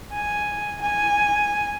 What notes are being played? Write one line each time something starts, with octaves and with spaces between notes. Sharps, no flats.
G#5
G#5